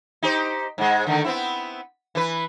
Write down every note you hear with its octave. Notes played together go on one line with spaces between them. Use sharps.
D#4 G4 C5
G#2 G#3
D3 D#3 A3
B3 C4 E4
E3 B4